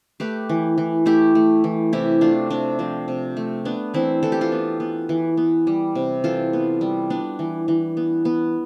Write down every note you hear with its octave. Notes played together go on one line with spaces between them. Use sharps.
A3 G4 B4
E3
E3
A3 E4 G4
A3
E3
C3 E4 G4
A3 D4 F4
C3 D4
F3 C4
C3
A3
B3 D4
E3 C4 E4
E3 A4
G4
F4 A4
B3
B3
E3
B3
G3
C3
E3 F4 A4
B3
G3
B3 D4
E3
E3
B3
B3